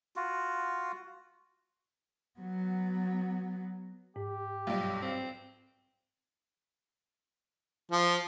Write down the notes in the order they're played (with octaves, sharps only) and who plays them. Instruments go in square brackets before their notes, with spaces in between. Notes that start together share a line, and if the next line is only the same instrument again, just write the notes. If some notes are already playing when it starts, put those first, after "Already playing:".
[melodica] F4 F#4
[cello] F#3 B3
[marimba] G#2 [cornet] G4
[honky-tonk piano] B1 G2 [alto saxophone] F4
[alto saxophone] C4
[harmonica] F3